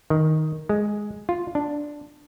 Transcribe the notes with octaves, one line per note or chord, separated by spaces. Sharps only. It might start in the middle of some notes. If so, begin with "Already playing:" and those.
D#3
G#3
F4
D4